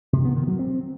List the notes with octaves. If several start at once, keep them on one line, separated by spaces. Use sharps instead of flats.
C3
B3
D#3
F#3
C4